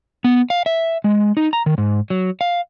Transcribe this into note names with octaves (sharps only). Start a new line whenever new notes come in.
B3
F5
E5
G#3
D#4
A#5
D#3
G#2
F#3
F5